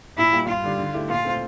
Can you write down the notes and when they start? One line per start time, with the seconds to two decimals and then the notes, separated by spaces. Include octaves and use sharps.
0.18 A#2 E4
0.32 G3 A#3 F4
0.48 G2 F4
0.64 D3 G3 D4 G4
0.79 D3
0.94 A3 E4 G4
1.09 A#2 F4
1.25 A3 C4